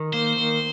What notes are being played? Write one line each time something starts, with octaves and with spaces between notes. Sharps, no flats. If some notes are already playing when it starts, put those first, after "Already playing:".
Already playing: D#3
A#3 C5
D#3